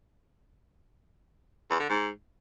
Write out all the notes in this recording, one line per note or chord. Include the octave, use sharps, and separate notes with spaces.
E2
D3
G#2